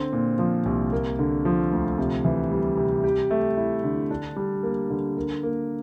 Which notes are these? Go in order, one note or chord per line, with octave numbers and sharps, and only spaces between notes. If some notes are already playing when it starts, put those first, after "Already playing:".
Already playing: D3 C4
A#2
F3
C2
A#3
D3
F3
D2
C3
E3
G3
C3
G4
A3
E4
D3
D4
G3
A#3
D3
A#4
A#3